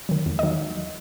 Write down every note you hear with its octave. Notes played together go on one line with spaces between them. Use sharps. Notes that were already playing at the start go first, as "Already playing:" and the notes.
D#3 F#3
E2
D#3 F#3 D#5